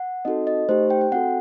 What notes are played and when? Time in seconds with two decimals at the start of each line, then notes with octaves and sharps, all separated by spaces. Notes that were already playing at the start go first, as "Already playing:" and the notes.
Already playing: F#5
0.25 C4 D#4 F#4 A4 D#5
0.47 D#5
0.69 A3 D#4 G4 C5
0.90 G5
1.01 G5
1.12 C4 F#4 A4 F#5